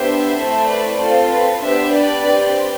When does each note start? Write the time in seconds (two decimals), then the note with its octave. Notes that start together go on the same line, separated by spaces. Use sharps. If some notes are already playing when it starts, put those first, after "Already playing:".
Already playing: B3 D4 G4 C5 E5
0.36 A3 C4 E4 A4
0.67 B4 D5
0.98 C4 F4 A4 C5
1.30 B4
1.62 B3 D4 G4 C5 E5
1.93 B4 D5
2.25 C4 G4